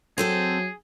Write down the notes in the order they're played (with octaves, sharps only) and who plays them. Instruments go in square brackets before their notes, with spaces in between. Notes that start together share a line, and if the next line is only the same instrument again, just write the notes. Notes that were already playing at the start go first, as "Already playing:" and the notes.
[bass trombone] F#3 [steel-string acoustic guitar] C4 A4 C5 [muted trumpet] G#4